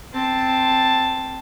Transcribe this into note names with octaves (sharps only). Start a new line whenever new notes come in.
C4 A5